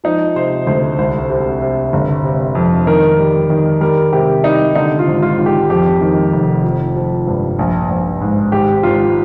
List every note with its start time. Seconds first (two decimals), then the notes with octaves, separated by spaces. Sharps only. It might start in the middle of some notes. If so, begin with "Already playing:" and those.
0.04 F3 D#4
0.35 C3 C5
0.67 D2 C5
0.98 C2 C5
1.30 C3
1.61 C3
1.93 G1
2.24 C3
2.55 F2
2.87 D#3 A#4
3.18 G3
3.50 D#3
3.81 G3 A#4
4.13 C3 G4
4.44 G3 D#4
4.75 D3 D#4
4.99 F4
5.08 G#1
5.22 F4
5.38 G#1
5.46 G4
5.70 F2 G4
6.01 D#3
6.32 F1
6.64 F3
6.96 F3
7.27 G2
7.59 A#1
7.90 A#1
8.21 G#2
8.52 G#1 G4
8.83 G#1 F4